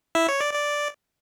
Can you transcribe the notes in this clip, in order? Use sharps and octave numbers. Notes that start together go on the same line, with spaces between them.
E4 E5
C#5
D5
D5